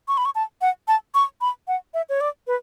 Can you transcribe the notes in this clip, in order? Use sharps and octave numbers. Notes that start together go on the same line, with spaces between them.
C#6
B5
C#6
A5
F#5
A5
C#6
B5
F#5
E5
C#5
D5
B4